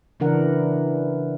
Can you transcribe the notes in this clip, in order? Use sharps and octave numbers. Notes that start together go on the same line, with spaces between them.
C#3 E3 D4 A#4 F#5